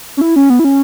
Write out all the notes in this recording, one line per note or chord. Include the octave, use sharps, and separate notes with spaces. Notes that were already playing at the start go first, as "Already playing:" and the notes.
C#4
E4
C#4
B3
E4
C#4